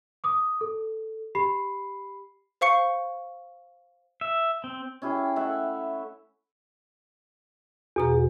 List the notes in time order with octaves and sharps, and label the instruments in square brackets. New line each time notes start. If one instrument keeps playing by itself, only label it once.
[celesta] D6 D#6
A4
G4 B5 C7
[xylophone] C5 F5 C#6 C#7
[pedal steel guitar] E5
C4
[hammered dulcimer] C#4 E4 G4 G#4
A3 E5 F#5
[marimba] E2 B2 A#5 [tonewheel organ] F#4 G#4